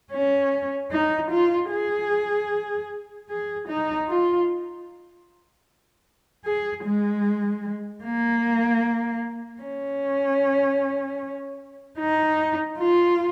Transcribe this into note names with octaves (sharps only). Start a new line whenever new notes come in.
C#4
D#4
F4
G#4
G#4
D#4
F4
G#4
G#3
A#3
C#4
D#4
F4